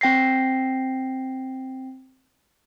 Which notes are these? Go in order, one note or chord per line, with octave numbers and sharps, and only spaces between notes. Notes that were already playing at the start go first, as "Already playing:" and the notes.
C4 G5 A#6 C7